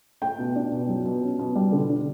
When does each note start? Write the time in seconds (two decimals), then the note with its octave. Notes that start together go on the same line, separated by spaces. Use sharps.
0.22 A3 G5
0.39 B2
0.56 D4
0.72 B2
0.89 F#3
1.05 B2
1.22 C#4
1.39 B2
1.56 G3
1.72 D3
1.89 D4